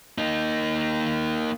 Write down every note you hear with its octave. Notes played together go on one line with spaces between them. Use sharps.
A#3 D#4